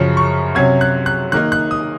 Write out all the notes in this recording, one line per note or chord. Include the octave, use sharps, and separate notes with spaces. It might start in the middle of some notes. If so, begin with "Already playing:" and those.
Already playing: F#2 C#3 F3
C#6
C3 F#3 C#4 G#6
F#6
F#6
D#3 A#3 D#4 F#6
F#6
D#6